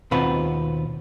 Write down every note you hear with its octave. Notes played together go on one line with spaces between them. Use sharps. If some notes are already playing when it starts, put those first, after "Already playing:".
D#2 B2 C4 F4 B4 F#5